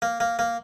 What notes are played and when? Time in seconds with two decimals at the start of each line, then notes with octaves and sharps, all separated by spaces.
0.02 A#3
0.20 A#3
0.39 A#3